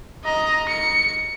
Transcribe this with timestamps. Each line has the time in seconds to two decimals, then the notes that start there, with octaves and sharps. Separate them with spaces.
0.25 D#5 A#5
0.68 C#7